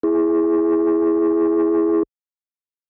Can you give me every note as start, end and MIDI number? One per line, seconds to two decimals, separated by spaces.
0.03 2.03 64
0.03 2.03 68